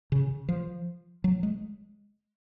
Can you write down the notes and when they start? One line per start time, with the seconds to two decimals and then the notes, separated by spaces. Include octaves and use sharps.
0.12 C#3
0.49 F3
1.24 F#3
1.43 G#3